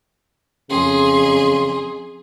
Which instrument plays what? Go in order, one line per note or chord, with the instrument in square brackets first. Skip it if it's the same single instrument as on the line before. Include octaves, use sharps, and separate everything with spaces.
[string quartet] F2 G#4 C6 [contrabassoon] C#3